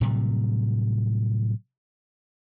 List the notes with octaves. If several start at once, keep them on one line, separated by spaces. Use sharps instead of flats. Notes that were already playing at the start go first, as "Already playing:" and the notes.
A2 C3 F#3 G3